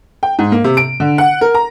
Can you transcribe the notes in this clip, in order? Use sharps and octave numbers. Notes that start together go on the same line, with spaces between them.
G5
G#2
A#3
C3
D7
D3
F#5
A#4
A#5